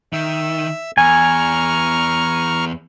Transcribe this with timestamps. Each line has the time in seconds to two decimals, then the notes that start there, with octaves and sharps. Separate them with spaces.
0.13 D#3 E5 E6
0.97 E2 G#5 A#5 C#6 F6